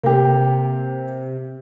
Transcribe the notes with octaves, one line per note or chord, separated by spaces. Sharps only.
C3 A#3 G4